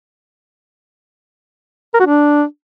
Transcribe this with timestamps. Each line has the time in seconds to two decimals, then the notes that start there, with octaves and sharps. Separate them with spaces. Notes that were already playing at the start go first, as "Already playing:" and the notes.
1.94 A#4
2.00 F#4
2.06 D4